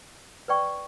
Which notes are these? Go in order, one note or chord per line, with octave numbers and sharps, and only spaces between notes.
B4 D5 G5 C#6